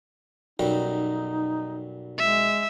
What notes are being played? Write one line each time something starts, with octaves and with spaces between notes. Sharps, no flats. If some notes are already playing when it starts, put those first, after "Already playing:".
B1 F#2 G3 D#4
G#3 E5